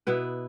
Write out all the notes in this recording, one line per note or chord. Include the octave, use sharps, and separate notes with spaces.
B2 B3 E4 B4